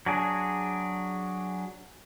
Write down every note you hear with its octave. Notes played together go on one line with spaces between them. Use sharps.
F#3 D4 G#4